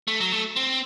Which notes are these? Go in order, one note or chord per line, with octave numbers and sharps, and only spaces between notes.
A3
F#3
A3
C4